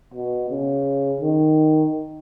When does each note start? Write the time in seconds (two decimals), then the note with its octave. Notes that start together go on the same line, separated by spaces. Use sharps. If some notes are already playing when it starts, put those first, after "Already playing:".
0.14 B2
0.50 C#3
1.21 D#3